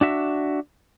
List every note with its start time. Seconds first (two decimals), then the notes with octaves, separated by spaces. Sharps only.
0.01 D4 F#4 E5